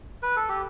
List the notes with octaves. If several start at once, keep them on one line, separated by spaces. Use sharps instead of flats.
B4
A4
G4